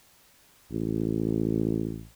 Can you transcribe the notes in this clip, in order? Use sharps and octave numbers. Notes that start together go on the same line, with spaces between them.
A1